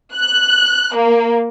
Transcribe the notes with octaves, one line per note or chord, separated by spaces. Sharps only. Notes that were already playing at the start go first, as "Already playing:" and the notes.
F#6
A#3